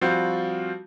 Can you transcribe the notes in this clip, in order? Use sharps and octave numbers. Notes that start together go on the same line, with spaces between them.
F3 G3 C4 F4 F#4